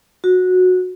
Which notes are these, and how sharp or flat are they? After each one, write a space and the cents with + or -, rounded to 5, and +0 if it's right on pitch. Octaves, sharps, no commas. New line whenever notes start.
F#4 -15